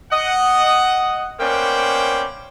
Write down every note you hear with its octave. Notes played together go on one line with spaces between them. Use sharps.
D#5 F#5
A#3 B3 C#4 C5 D5 G5